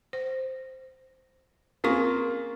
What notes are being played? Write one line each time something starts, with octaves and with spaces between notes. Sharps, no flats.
C5
A#3 C4 C#4 F4 G#4 C#6